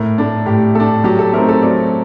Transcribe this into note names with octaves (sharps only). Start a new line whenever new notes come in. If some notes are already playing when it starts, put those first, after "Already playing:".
Already playing: A2 A#4
A3 D4
A2 G4
A3 D4 A4
F#3 G4
A4
A3 C4 D#4 A#4
A4
F#3 D5